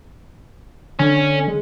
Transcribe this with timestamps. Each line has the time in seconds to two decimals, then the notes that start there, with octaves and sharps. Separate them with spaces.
0.99 D3 C#4
1.48 G#3